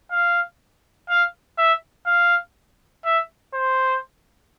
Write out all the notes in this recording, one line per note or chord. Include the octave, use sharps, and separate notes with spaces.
F5
F5
E5
F5
E5
C5